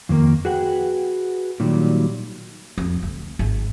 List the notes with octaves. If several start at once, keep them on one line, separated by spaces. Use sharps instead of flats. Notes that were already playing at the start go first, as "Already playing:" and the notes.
F2 D#3 A#3 A#4
F#4 G#4 B4 F#5 G5
A#2 D#3 F#3 G3
F2
D2
G#1